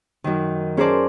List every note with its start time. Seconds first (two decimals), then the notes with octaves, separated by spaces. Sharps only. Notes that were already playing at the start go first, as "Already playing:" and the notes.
0.24 F#2 D#3
0.77 C#4 G#4 A#4 C5 D5 A5